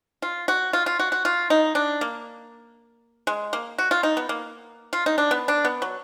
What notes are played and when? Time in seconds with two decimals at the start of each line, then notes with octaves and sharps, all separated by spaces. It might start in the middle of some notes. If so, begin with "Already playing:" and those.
0.22 F4
0.48 F#4
0.73 F4
0.86 F4
0.99 F#4
1.12 F#4
1.25 F4
1.50 D#4
1.75 D4
2.01 A#3
3.27 G#3
3.53 A#3
3.78 F#4
3.91 F4
4.03 D#4
4.17 B3
4.29 A#3
4.93 F4
5.06 D#4
5.18 D4
5.31 B3
5.48 D4
5.65 B3
5.82 F#3